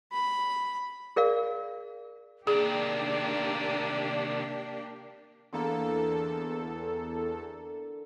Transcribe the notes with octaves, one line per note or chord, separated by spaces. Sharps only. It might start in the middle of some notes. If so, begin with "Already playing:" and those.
B5
G#4 A#4 D5 F5
C3 D#3 A#3 D4 G4 G#4 D5
E2 D3 A#3 A4